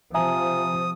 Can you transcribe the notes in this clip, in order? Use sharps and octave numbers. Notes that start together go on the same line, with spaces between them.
C3 F3 E5 G#5 A#5 D#6